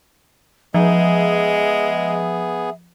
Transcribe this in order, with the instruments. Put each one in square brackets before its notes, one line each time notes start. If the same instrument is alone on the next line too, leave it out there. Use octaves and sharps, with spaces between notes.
[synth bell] F3 [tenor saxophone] G#3 [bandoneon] B3 G#4 [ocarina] E5